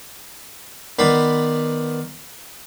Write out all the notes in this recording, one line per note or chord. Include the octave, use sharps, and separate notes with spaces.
D#3 B3 D5 B5 C6